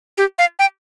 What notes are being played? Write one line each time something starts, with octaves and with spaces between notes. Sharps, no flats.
G4
F5
G5